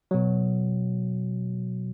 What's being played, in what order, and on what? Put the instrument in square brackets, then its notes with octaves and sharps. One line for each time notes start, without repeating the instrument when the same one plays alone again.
[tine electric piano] B2 F#3